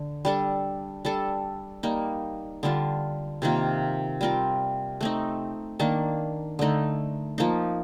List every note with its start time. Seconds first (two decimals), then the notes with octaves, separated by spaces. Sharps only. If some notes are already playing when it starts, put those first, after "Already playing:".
Already playing: D3
0.25 G3 D4 A4
1.05 G3 D4 A4
1.83 G3 A#3 D#4
2.63 D3 G3 D4 F4
3.42 C3 D#3 A#3 F4
4.21 G3 C4 F4 A#4
5.01 A3 C4 D#4
5.79 D#3 A#3 D4
6.59 D3 A3 D#4
7.38 F3 A#3 D#4